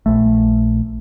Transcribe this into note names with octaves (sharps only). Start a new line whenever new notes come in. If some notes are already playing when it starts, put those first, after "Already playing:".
A#1 A3